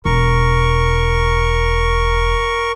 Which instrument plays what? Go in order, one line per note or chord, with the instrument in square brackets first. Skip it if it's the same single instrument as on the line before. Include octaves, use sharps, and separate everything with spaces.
[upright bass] E1 [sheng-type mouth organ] A#4 C#6